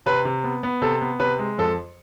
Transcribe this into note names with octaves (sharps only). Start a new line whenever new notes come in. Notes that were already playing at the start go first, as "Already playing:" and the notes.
C3 B4
C3
B3
B3
C3 A4
B3
C3 B4
G#3
F2 A4